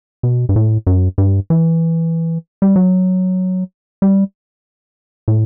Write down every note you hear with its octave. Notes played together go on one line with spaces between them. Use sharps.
B2
G2
A2
F#2
G2
E3
G3
F#3
G3
A2